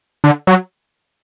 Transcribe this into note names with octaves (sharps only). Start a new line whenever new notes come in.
D3
F#3